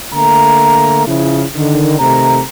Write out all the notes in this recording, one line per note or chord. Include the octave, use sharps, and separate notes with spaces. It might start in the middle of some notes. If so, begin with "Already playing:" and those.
D3 A3 A#3 A#5
C#3 F3 E4
D3 D#3
C3 D#3 A3 C5 A#5